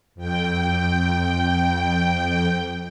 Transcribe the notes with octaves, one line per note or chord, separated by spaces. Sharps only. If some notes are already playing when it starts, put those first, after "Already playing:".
F2 G5